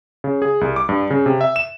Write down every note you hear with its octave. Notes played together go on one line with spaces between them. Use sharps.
C#3
G#4
C2
D6
G2
C#3
C3
E5
E7